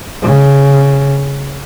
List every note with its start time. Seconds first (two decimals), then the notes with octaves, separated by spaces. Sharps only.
0.22 C#3